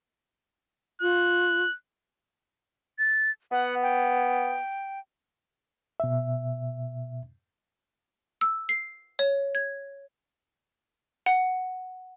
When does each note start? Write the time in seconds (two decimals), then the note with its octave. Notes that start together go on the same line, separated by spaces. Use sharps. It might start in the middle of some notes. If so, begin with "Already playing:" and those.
1.02 F4 F#6
2.99 A6
3.52 B3 F#5
3.83 G5
6.00 B2 E5
8.41 E6
8.69 C7
9.19 C#5
9.55 G#6
11.26 F#5